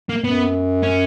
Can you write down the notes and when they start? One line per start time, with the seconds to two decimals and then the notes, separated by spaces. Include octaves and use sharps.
0.09 A#3
0.23 F#2 B3
0.83 C#4